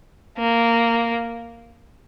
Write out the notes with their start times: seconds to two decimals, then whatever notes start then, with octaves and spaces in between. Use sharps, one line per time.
0.38 A#3